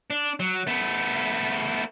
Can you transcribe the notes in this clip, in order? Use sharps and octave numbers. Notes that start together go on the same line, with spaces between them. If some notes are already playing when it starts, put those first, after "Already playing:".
D4
F#3
A3 B3